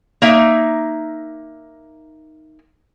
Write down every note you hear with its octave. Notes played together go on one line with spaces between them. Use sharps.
A#3 D#4 E5